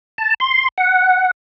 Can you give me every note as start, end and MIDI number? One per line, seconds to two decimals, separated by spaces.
0.18 0.34 81
0.40 0.68 84
0.78 1.31 78